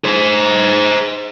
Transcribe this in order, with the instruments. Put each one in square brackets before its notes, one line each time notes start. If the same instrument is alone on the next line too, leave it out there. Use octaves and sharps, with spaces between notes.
[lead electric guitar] G#4 C5